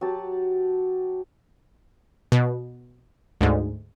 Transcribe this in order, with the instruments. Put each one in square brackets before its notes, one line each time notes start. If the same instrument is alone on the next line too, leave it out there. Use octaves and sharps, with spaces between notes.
[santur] F#3 G4 F#5 A5
[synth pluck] B2
D2 G#2